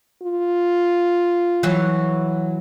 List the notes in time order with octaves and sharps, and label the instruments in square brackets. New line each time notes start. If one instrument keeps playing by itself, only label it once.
[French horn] F4
[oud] E3 F#3